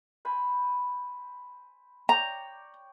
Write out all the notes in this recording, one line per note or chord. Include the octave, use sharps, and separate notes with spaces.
C5 G#5 B5
C#5 D5 G5 A#5